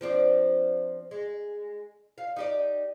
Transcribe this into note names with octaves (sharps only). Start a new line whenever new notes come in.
F3 C4 D4
G#3
F5
D#4 G4 D5